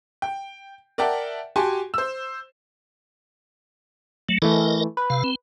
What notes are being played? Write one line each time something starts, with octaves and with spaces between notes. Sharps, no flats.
G5
A#4 D5 E5 F#5 G5 A5
F#4 G4 G#5 A5 C6
C5 E6
F#3 A3
E3 A3 A4 A#4 D#5
B4
C3 F5
C4